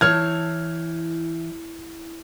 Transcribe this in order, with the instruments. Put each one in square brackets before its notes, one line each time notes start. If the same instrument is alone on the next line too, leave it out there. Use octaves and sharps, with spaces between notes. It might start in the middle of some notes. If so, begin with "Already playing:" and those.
[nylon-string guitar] E3 C#5 [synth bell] E4 [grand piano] F6 G#6